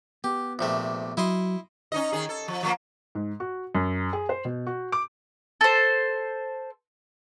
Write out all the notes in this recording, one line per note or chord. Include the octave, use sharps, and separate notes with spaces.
B3 G4
A#1 C3 A3
F#3 E4 D#5 C6
C#4 D#4 D#5
D#3 G#4
A4
F3
F3 G3 A#3
G#2
F#4
F#2
G#4
C5
B2
F#4
D6
A4 C5